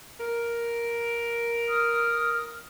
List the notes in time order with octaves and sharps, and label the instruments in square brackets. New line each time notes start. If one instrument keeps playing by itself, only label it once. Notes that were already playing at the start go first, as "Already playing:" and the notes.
[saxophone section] A#4
[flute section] D#6 F6